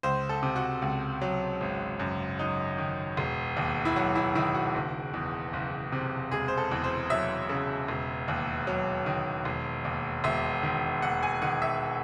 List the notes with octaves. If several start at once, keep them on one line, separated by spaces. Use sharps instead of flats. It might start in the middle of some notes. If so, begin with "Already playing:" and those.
C#2 C5
A4
C3
F#4
C#2
F#3
G#1
F#2
F#3 D#4
D#3
E1
D#2
E4
F#3 F#4
E4
D#3 E4
F#4
F#1
E2
F#1
C3
E1 G#4
C5
A4
E2
C5
F#3 E5
C#3
E1
D#2
F#3
D#3
E1
D#2
E1 E5
D#3
D#2 F#5
G#5
D#3 F#5
E5